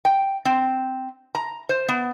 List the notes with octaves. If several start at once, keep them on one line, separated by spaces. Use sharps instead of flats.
G5
C4
A#5
C5
B3